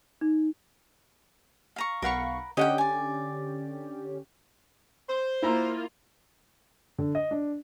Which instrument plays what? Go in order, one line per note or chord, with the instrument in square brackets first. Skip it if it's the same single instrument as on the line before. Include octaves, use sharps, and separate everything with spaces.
[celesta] D#4
[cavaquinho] F5 A#5 C#6
[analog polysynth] B1 F5 C#6 [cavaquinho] A#4 F#5 B5
[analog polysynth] D3 C#4 G4 [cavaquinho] D#5 F#5 G5
[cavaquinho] D5 G#5
[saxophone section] C5
[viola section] A#3 F4 [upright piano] E4 A#5
[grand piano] D3
D#5
D4